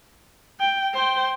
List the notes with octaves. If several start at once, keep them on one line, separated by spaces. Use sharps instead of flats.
G5
C5 G5